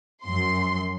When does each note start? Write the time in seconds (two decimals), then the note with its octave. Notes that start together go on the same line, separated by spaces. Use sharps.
0.24 F#2 C6